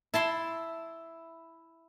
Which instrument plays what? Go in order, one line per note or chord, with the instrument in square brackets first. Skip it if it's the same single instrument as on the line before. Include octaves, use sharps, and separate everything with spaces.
[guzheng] E4 A5 C6